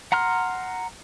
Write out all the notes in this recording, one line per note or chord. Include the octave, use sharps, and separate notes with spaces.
F#5 A#5 C6 F6